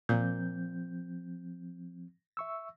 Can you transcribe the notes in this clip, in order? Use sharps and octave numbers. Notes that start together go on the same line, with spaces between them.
A#2 F3 C4 G6
E5 C#6 E6